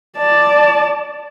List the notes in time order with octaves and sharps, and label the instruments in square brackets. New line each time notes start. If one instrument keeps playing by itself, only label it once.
[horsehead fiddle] D5 A5